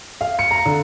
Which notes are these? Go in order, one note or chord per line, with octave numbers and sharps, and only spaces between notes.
F5
C#7
A#5
D3